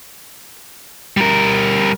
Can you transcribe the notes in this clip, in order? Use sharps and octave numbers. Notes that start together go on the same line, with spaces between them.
G3 A#4